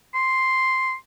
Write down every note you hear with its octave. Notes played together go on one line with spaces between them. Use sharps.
C6